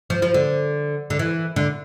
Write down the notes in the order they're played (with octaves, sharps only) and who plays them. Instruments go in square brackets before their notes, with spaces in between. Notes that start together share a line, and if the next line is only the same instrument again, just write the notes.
[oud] F3
F3
D3
D3
E3
D3